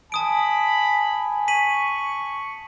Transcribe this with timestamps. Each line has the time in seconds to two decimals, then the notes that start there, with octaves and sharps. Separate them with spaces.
0.12 G#5 A5 B5 D#6 D7
1.48 C#6 B6 D#7 F#7